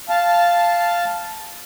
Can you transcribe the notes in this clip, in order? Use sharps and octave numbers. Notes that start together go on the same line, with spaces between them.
F5 A5